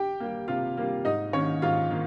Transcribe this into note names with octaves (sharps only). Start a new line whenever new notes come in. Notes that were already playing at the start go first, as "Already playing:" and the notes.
Already playing: G4 G5
G3 A#3
C3 F4 F5
G3 A#3
G#2 D#4 D#5
D#3 C#4 C#5
A#3
G#2 F4 F5
D#3 A#3